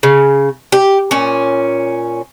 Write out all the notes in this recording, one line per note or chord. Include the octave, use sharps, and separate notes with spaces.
C#3
G4
A#2 C#4